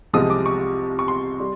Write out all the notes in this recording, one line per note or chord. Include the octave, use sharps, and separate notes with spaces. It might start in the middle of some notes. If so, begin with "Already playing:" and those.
C2 C3 F3 G#3 C4 D#6
D6
C#6
C#6
C6
G3